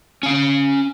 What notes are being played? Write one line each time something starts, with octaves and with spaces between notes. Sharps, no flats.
C#4 F5